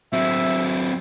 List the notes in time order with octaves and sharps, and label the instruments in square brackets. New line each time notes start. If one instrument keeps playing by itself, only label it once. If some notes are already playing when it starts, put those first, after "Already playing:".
[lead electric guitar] F#3 C4 [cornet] E5